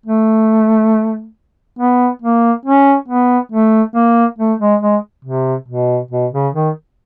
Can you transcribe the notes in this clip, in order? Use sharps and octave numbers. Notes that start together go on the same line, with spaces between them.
A3
B3
A#3
C#4
B3
A3
A#3
A3
G#3
G#3
C3
B2
B2
C#3
D#3